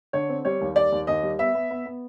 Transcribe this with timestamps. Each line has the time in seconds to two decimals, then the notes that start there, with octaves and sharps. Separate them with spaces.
0.13 D3 C#5
0.29 C4
0.45 G3 C#5
0.61 D#2
0.76 G3 D5
0.92 D#2
1.07 D#2 D#5
1.23 G3
1.39 B3 E5
1.54 B3
1.70 B3
1.86 B3